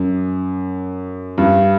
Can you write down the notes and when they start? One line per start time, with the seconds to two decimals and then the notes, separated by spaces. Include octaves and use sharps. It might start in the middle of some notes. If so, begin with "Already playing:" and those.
Already playing: F#2
1.38 G2